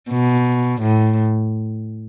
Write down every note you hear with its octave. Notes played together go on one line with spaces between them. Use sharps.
B2
A2